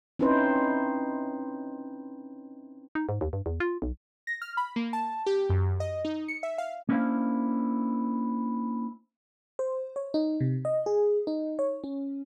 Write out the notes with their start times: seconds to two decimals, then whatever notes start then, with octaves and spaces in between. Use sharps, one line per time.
0.19 C4 C#4 D#4 E4 B4 C5
2.95 D#4
3.09 G#2
3.21 D#2
3.33 G2
3.46 E2
3.60 F4
3.82 B1
4.27 A#6
4.42 F6
4.57 B5
4.76 A#3
4.93 A5
5.26 G4
5.50 F#2
5.80 D#5
6.05 D#4
6.28 C#7
6.43 E5
6.58 F5
6.89 A#3 C#4 D4 E4 C5 F5
9.59 C5
9.96 C#5
10.14 D#4
10.41 C3
10.65 D#5
10.86 G#4
11.27 D#4
11.59 C#5
11.84 C#4